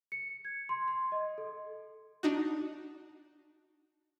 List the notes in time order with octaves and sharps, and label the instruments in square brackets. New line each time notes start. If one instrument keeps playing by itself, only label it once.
[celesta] C#7
G#6
C6
C6
D#5
A4
[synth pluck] D4 D#4 F#4